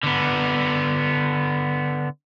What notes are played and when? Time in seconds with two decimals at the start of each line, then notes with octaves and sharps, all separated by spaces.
0.04 D3 B3